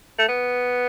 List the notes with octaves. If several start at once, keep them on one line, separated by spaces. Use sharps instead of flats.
A3
B3